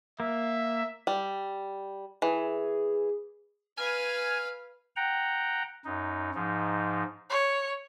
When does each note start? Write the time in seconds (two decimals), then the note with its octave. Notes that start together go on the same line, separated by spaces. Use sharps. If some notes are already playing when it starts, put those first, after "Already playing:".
0.20 A#3 E5
1.07 G3
2.22 E3 G#4
3.77 B4 F5 G#5 F6
4.96 F#5 G5 A#5
5.85 F#2 D#4
6.35 G#2 F3 D#4
7.30 C#5